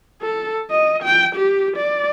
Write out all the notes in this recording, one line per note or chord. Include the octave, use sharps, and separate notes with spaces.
A4
D#5
G5
G4
D5